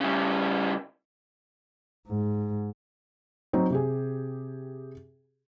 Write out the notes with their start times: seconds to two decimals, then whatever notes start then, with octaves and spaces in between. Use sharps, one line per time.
0.01 C#3 G3
2.07 G#2
3.53 F#3 C4 D#4
3.70 C3 G4 G#4